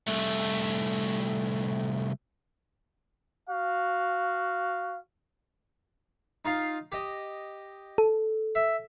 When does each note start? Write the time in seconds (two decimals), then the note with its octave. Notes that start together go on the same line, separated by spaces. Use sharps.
0.08 C2 A3
3.49 F#4 F5
6.45 D#4 F4 F5
6.92 G4 D#5
7.98 A4
8.55 E5